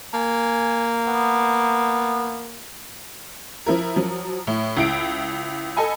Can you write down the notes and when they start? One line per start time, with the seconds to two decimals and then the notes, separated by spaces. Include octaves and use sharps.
0.14 A#3 G#5
1.07 B3
3.66 F3 E4 A#4
3.96 F3 F#3
4.47 A2
4.77 C#2 E4 D7
5.76 A4 D#5 G#5 B5